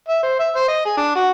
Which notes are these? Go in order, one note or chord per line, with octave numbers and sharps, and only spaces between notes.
E5
C5
E5
C5
D#5
G#4
D4
F#4